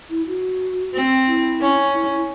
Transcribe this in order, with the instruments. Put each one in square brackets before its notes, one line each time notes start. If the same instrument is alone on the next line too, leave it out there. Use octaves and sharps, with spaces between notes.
[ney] E4
F#4
[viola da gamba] C4
[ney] E4
[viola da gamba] C#4
[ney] E4
E4